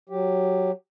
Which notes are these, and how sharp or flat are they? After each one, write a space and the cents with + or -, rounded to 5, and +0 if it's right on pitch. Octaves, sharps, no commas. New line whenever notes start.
F#3 +0 G4 +0